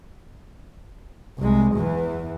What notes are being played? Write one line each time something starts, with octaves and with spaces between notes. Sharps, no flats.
C2 G#3
E2 E3